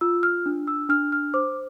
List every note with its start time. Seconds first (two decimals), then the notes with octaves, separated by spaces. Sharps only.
0.01 F4 E6
0.23 F6
0.46 D4
0.67 E6
0.89 D4 F6
1.12 F6
1.34 C5 D6